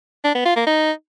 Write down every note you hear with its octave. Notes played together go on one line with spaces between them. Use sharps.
D4
B3
F4
A#3
D#4